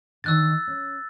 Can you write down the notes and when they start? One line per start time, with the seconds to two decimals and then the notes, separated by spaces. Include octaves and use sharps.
0.24 D3 D#3 C#5 E6 F#6 A6
0.67 C#4